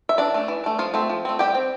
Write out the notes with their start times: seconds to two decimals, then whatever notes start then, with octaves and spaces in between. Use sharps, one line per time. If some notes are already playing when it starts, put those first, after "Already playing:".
0.09 E5
0.18 E3 D4 D5
0.34 A3 D4
0.48 E3
0.64 A3 D4
0.79 F3 F4 F5
0.94 A3 C4
1.09 F3
1.25 A3 C4
1.39 G3 G4 G5
1.55 C4